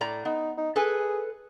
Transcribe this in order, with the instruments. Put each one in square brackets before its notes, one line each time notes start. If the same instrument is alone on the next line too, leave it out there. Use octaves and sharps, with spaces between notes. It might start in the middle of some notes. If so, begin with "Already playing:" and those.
[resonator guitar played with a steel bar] A2 D5 A#5
[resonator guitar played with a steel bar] B3 [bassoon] D#4
[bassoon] D#4
[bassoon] G#4 [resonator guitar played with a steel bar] A4 B4 G#5